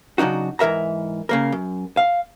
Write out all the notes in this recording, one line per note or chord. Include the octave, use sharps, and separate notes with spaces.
C#3 F#3 D4 D#4 F#4
G#2 E3 A#4 E5 A#5
C#3 A#3 A#4
F#2
F5